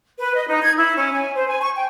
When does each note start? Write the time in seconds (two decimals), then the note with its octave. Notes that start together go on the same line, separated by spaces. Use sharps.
0.17 B4
0.35 D#5
0.47 D#4
0.63 G#6
0.76 E4
0.95 C#4
1.10 G#5
1.34 C5
1.47 G#5
1.59 C#6
1.75 G5